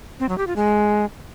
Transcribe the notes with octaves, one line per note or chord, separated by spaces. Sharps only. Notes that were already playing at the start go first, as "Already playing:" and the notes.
C4
F#3
G4
F4
G#3